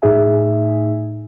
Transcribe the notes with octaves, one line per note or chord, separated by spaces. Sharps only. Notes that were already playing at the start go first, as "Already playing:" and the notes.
A2 A3 D#4 G#4 E5 G#5